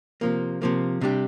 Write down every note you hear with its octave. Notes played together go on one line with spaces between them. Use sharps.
C3 F3 A#3
C3 F3 A#3
C3 G3 D4 G4